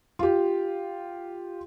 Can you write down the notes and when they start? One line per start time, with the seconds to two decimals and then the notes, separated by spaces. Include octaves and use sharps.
0.19 F4 G4